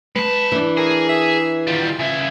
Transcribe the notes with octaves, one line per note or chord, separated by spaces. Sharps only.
G#3 B4 A5
E3 D4
G#4 A#4
E5
D#3 G3 F4
C#3 E4